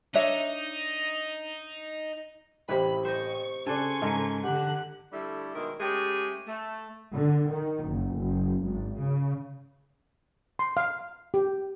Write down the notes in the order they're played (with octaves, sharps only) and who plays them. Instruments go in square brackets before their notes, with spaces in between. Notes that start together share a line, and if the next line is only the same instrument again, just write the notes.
[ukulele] D4 C#5 E5 [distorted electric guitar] D#4
[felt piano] A1 [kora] C3 E4 B4 [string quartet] B5
[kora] C5 D#5 [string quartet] C#6
[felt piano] C#3 F#6 [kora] A4 D5 [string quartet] G#5 C6 C#6
[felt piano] G#2 C#3 [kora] A4 A#4
[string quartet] D3 F#6 [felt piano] G4 F#5
[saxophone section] D3 G3 A3 E4
B2 D#3 G#3 E4 A#4
G#3 A3 C#4 G4 G#4
A3
[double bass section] D3
D#3
F#1
F#1
G#1
C#3
[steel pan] C6
F5
G4